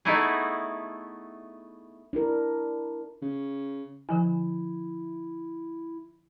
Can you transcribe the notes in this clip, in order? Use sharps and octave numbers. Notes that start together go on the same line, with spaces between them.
A3 B3 D#4 E4 F#4 G#4
D4 E4 A#4
C#3
D3 F3 E4 G#5